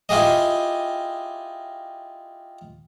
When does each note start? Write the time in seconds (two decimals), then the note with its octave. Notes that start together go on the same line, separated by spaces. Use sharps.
0.09 E4 F4 G4 G#4 D#5